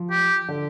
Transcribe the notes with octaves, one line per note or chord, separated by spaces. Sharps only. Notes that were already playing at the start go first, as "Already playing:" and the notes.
Already playing: F3
G4
D3